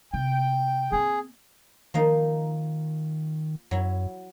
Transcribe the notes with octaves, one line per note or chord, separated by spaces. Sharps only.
C3 G5
A#3 C4 G#4
D#3 F3 A#3 D#4
F#2 F#3 E4